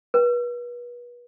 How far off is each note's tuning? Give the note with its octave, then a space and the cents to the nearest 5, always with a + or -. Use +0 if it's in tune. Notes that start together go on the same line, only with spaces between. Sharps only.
B4 -35